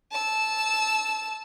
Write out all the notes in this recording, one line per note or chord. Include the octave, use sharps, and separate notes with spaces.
A5 E6